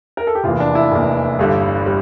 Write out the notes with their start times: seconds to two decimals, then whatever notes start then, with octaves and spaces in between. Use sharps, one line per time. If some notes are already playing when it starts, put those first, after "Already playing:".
0.17 A#4
0.27 A4
0.35 G4
0.44 F1 E2 E3 A#3 F4
0.60 D4
0.75 E4
0.92 F1 E2 E3 A#3
1.39 G1 G2 D3 G3
1.86 G3